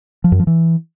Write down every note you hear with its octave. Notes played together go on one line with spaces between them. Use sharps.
F3
F#2
F3
E3